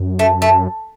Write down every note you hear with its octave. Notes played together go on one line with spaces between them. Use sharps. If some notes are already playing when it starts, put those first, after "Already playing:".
Already playing: F#2
A3
A3